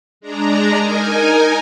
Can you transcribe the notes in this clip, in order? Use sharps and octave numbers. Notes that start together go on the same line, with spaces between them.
G#3 D4 A#5
D#4 A#4 G#5